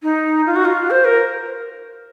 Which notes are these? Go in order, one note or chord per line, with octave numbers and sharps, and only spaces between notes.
D#4
F4
F#4
F4
C5
A#4